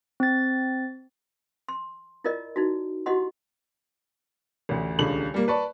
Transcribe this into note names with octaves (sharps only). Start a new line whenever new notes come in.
C4 A6
C6
E4 F4 A#4 D5 D#5
D#4 E4 F#4
E4 F#4 G4 D#5 F#5 C6
A1 D2
D#1 C#2 D3 F#7
G3 A#3
B4 D5 A5 C#6